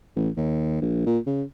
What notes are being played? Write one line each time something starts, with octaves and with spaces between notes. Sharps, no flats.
A1
D#2
A#1
A#2
C#3